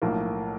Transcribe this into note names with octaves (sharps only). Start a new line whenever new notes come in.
B1 A2 F3 A#3